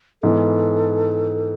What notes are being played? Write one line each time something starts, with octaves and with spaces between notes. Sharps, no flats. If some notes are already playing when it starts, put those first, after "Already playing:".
G#2 E3 B3 A4